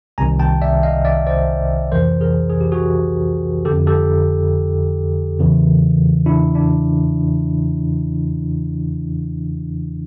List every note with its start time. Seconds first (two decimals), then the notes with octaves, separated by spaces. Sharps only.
0.18 C2 C3 D#3 G#5 A#5
0.39 G5 A5
0.62 D5 E5
0.83 D#5 F5
1.05 D5 E5
1.27 C5 D5
1.92 F2 C3 E3 A#4 C5
2.21 G#4 A#4
2.50 G#4
2.61 G4
2.72 F#4 G#4
3.65 D3 G4 A4
3.70 F2
3.87 G4 A4
5.39 E2 C#3 E3
6.26 D4 E4
6.55 D4